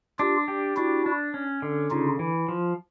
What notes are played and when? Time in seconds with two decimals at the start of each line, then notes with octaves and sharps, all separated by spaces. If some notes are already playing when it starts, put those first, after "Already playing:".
0.19 D4 F4 G4
0.48 G4
0.77 D4 E4 F#4
1.06 D4
1.34 C#4
1.62 D3
1.90 C#3 D#4 F4
2.19 E3
2.48 F3